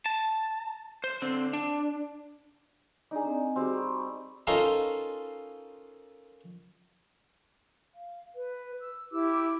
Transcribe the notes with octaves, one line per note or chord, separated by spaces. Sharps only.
A5
C5
D3 C4
D4
D4 D#4 G#4 D5 A#5
C4
G3 C4 F#4 G#4
A#5 B5 C#6
C#4 D#4 F4 A4 A#4 C5
F5
B4
E6
E4 G4 D6 E6